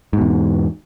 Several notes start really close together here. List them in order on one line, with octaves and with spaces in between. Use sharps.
G#2 B2 E2